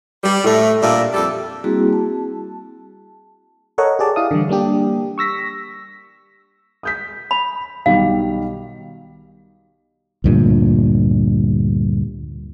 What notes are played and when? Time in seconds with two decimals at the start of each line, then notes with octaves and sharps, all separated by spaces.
0.24 G3
0.45 A2 A3
0.82 A#2 G3 D4 E5
1.14 F2 G3 A4
1.64 G3 A#3 C4 E4 F#4 G#4
1.93 A5
3.78 A4 A#4 C#5 D#5 F#5
3.99 G4 G#4 D5 A5
4.16 E4 F5 D#6
4.31 D3 E3 G3
4.49 G3 A#3 D4 G4
5.18 C#6 E6 A#6 B6
6.83 D#6 G6 B6
7.31 B5
7.86 B1 D#3 G3 F5
10.24 D2 G2 A#2